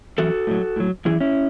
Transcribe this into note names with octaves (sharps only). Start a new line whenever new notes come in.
F#2 E3 F#4 A4
A2 F#3
A2 F#3
F#2 E3 E4 G#4
C#4 E4